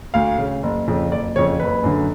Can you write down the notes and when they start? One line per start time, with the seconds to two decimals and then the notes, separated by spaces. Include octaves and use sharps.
0.14 D2 F5
0.39 C#3
0.63 F#1
0.88 F2 C#3
1.12 F#1 D5
1.36 F2 C#3 C#5
1.60 F#1 B4
1.84 F#2 D3